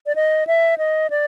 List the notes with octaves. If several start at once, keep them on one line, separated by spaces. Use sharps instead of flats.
D5
D#5
E5
D#5
D5